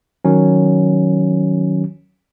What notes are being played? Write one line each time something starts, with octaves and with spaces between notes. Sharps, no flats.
D#3 F#3 C#4